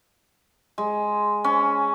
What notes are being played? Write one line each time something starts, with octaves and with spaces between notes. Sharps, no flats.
G#3
C#4